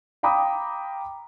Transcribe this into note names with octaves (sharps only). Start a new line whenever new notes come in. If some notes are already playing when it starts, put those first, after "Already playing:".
F5 G5 A#5 B5 D6 D#6